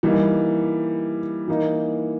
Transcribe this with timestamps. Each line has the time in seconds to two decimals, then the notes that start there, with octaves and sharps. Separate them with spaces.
0.03 E3 G3 A#3 D#4
1.48 E3 A#3 D#4